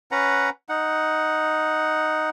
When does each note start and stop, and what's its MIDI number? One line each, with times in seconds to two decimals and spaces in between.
0.11 0.50 61
0.11 0.50 71
0.11 0.50 78
0.11 0.50 82
0.69 2.30 63
0.69 2.30 78